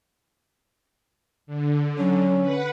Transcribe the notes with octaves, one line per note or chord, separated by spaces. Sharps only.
D3
F#3 C#4
B4 F#5